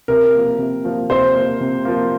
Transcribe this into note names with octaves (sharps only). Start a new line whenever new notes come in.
C3 A#4
F3 A#3
C3
F3 A#3
C3 C5
F3 A#3
C3
F3 A#3